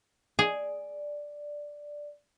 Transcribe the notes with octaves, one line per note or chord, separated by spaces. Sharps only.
G#4 D5